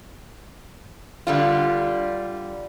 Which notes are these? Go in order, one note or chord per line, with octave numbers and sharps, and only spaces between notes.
D3 G3 F4